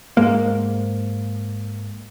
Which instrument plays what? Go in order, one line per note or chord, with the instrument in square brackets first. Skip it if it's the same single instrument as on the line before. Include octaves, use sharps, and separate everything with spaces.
[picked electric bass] G#2 G#3 A#3